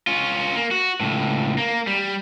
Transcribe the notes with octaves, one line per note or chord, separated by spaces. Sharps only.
C#4 F4
A#3
F#4
C#2 A2
A#3
G3